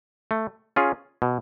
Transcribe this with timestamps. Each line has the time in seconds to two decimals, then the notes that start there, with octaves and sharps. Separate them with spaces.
0.31 A3
0.76 C#4 F4 G#4
1.22 B2